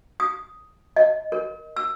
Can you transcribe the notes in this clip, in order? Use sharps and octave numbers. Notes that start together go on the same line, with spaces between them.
D#6
D#5
A#4
E6